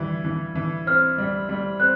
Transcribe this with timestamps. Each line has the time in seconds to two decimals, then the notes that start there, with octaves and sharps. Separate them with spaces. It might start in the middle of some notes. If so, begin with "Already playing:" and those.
Already playing: E3 G3
0.24 E3
0.55 E3
0.87 C4 F6
1.18 G3
1.49 G3
1.80 C4 F#6